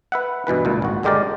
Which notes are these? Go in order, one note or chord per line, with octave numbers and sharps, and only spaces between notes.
B4 E5 F#5
G2 B2 E3 B4
C#2 A#2
G#1 F#4
G2 D3 G#3 G4 A#4 D5